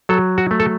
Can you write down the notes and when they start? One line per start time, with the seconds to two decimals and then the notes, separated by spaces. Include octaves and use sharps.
0.09 F#3 A4
0.38 F#4
0.51 A3
0.60 A4